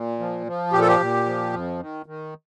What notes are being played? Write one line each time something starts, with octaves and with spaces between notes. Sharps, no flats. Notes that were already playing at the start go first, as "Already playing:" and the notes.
Already playing: A#2
F3
F3
A#2 G4
A4
G4
A#2
F3
F2
D#3
D#3